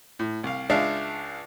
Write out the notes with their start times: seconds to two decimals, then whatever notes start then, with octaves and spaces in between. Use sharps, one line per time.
0.19 A2
0.44 C2 F5
0.70 C#2 G#3 D4 E5 F5 A5